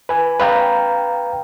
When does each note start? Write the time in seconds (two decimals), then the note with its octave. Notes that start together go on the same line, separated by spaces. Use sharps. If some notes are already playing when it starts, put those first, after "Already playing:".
0.09 B4 G#5
0.40 B4 F5 G5 A#5